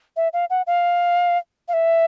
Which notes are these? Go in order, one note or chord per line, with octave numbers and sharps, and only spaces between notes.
E5
F5
F#5
F5
F5
E5